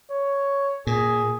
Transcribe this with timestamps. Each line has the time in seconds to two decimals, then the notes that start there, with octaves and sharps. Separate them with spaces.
0.10 C#5
0.87 A#2 G#4